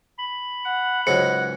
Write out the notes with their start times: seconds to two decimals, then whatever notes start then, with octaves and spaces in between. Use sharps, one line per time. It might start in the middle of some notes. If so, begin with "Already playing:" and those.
0.19 B5
0.65 F#5
1.07 C#2 G#2 F#3 F#5 C#7